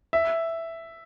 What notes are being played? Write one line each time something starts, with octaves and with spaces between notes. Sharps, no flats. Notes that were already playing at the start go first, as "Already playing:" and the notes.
E5